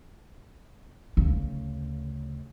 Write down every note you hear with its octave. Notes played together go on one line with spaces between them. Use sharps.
D2 C#3